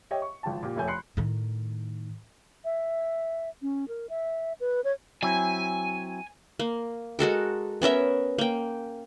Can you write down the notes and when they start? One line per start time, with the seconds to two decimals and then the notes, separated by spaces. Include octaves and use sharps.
0.11 G4 C#5 D#5 E5 G5
0.22 C#6
0.43 G#1 F3 G5 A5
0.63 A#2 G4
0.76 F1 F2 A3 C#5 G#5 G6
0.88 B5 C6 F#6 C7 C#7
1.17 A2 D#3
2.65 E5
3.62 C#4
3.88 A#4
4.09 E5
4.60 B4
4.84 C#5
5.23 F#3 C4 E4 G#5
6.59 A#3
7.19 G#3 F#4 A4 A#4
7.82 B3 C#4 A#4 E5
8.38 A#3 G5